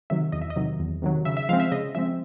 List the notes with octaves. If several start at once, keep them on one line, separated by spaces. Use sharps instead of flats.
C3 D#3 F#3 E5
E2 D#5
E5
D#5
C3 D#3 F#3
E2
C3 D#3 F#3
C#3 E5
E5
F3 G#3 C4 F5
E5
C#3 D#5
F3 G#3 C4 E5